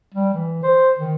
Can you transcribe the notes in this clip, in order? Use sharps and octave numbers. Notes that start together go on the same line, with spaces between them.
G3
E3
C5
D#3